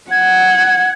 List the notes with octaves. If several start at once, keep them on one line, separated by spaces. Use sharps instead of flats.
F#5 G#6